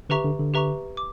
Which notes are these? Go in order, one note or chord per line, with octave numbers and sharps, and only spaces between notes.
D3 G4 B4 E5 A#5 C#6
D3
D3
G4 B4 E5 A#5 C#6
D6